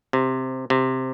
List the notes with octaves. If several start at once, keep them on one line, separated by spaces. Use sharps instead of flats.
C3
C3